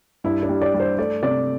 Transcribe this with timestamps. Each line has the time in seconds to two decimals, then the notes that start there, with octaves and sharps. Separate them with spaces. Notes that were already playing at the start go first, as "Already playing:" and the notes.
0.24 G2 E4
0.43 D4
0.49 G3
0.61 D5
0.74 G3
0.80 C5
0.99 A3 D5
1.23 C3 D5